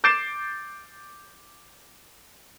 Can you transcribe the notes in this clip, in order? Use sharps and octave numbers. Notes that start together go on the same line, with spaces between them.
D6 G6 A6 C7 D7 E7